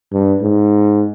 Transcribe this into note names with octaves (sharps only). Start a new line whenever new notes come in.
G2
G#2